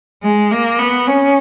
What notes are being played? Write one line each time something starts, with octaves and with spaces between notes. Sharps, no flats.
G#3
A#3
B3
C#4